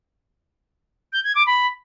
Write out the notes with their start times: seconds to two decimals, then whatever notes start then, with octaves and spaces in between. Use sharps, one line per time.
1.13 G6
1.24 G#6
1.35 D6
1.47 B5